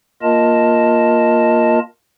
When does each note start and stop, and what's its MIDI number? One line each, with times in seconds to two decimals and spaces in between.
0.22 1.79 58
0.22 1.79 65
0.22 1.79 70
0.22 1.79 75
0.22 1.79 81